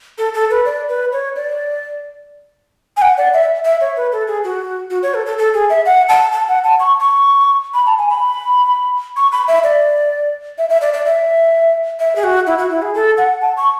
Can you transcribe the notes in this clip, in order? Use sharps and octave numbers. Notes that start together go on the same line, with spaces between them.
A4
A4
B4
D5
B4
C#5
D5
G#5
F#5
D5
E5
E5
C#5
B4
A4
G#4
F#4
F#4
C#5
A4
A4
A4
G#4
E5
F#5
A5
A5
F#5
A5
C#6
C#6
B5
A5
G#5
B5
C#6
B5
E5
D5
E5
E5
D5
D5
E5
E5
G#4
F#4
E4
F#4
E4
G#4
A4
F#5
A5
C#6